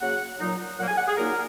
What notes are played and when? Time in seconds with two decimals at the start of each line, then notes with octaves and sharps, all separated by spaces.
0.01 C#3 F#3 A#3 F#5
0.40 A#2 F#3 D#4
0.78 A#2 F#3 A#3 F#5
0.88 G#5
0.98 F#5
1.08 G#4
1.17 A#2 F#3 A#3 D#4 A#4